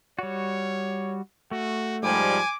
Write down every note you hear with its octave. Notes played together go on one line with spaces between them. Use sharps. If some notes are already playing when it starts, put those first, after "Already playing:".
G3 F#4 C#5
A3 F#4
G#2 F3 G3 G#5 D6